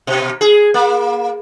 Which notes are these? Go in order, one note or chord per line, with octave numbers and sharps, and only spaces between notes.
B2
G#4
A#3